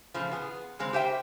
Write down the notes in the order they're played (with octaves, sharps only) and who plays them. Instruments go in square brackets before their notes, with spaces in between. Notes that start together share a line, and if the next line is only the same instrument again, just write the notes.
[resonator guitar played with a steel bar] A2 C#3 F3
B3 G#4
C#3 G#3 C4
G4 C5 E5 G5